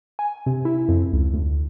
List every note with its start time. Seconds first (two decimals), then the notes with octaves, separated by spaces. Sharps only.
0.19 G#5
0.46 C3
0.65 E4
0.89 F2
1.12 C#2
1.34 D2